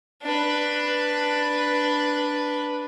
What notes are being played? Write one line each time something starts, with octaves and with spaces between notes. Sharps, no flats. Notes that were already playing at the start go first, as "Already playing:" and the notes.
D4 B4